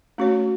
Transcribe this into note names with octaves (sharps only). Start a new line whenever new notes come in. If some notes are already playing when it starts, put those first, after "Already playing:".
A3 C#4 F#4 C#5